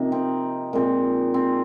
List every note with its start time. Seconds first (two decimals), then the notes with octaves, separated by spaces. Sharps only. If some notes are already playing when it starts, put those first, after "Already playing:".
Already playing: C3 F3 A#3 D#4
0.12 C4
0.73 A#2 G#3 C4
1.34 C4